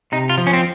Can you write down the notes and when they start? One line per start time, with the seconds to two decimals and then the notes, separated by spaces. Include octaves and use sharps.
0.12 C3 D#4
0.30 F4
0.38 F3
0.47 C#4
0.53 C4